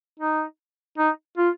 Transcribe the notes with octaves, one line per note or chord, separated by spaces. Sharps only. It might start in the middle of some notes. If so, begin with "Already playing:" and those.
D#4
D#4
F4